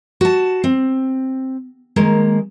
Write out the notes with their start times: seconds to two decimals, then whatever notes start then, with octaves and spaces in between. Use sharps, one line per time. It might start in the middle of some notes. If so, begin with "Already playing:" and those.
0.21 F#4 A5
0.64 C4
1.96 D#3 G#3 A#3